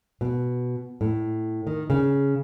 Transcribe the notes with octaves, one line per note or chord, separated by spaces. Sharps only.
B2
A2
D#3
C#3